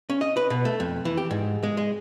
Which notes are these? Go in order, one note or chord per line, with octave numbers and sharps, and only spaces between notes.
C#4
D#5
B4
B2
A3
F2
E3
G4
G#2
G#3
G#3